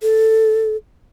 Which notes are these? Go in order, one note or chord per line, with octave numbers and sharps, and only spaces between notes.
A4